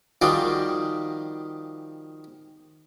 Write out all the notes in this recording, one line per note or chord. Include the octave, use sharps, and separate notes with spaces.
D#3 F3 G3 F#4 G#4 D5